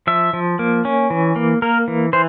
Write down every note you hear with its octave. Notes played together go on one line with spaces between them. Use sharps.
F3 E5
F3
A#3
C#4
E3
A#3
A#3 A#4
E3
E3 C5